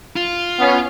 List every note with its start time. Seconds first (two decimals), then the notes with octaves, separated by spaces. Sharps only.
0.16 F4
0.59 B3 C#4